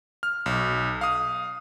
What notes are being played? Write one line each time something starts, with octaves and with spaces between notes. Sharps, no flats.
F6
B1
F5 D#6